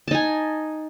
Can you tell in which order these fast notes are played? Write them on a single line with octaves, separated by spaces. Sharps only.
A5 D#4 G#5